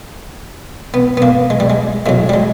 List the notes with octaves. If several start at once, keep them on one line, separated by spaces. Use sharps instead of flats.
B3
B3
A#3
G#3
G3
G#3
A2 F#3 G#3
G3
G#3